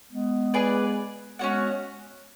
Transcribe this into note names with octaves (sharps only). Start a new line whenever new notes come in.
G#3 B3
G#4 B4 D5
G#3 B3 C#4 F#4 C#5 F#5